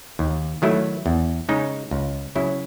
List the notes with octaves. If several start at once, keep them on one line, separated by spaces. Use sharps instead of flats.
D#2
D#3 F#3 A3 E4
E2
C#3 G#3 D#4
C#2
C#3 F#3 C#4 E4